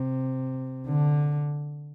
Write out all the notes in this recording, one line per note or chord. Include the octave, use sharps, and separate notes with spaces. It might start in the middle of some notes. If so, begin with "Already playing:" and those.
Already playing: C3
D3